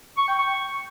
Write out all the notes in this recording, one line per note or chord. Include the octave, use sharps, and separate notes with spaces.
C#6
G5
C#6